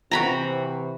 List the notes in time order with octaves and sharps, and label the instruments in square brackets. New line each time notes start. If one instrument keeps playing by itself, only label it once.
[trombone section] C3 E3 [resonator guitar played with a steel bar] C4 F#4 [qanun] A#5 B5